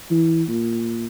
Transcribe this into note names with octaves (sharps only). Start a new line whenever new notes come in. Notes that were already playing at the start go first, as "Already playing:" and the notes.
E3
A#2